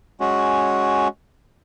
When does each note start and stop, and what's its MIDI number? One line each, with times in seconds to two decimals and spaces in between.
0.20 1.08 56
0.20 1.08 61
0.20 1.08 66